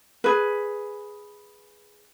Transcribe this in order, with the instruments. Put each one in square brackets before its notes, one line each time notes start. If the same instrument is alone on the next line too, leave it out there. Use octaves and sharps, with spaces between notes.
[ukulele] G#4 B4